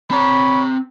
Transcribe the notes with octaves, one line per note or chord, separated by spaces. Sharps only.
C4 C#5 A#5 B5